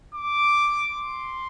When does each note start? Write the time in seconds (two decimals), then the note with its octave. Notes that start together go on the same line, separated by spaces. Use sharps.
0.14 D6
0.91 C6